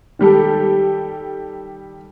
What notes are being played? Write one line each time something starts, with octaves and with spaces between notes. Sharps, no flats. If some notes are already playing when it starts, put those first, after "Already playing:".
D#3 G3 G4 A4